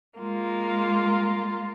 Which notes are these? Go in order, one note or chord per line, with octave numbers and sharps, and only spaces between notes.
G#3 A#3 F4